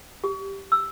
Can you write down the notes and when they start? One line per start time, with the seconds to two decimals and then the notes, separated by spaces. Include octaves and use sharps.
0.24 G4
0.72 E6